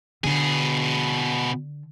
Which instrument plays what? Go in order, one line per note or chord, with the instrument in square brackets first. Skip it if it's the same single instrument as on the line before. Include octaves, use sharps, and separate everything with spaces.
[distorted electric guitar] B2 G#4 [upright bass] D3